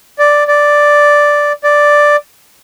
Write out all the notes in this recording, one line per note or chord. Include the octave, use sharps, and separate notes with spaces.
D5
D5
D5